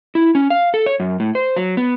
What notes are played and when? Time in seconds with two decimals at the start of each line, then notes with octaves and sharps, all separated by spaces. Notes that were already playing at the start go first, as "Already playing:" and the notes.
0.15 E4
0.35 C#4
0.50 F5
0.74 A4
0.86 C#5
1.00 F#2
1.20 A2
1.35 C5
1.56 F#3
1.77 B3